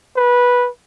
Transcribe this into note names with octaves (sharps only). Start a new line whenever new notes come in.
B4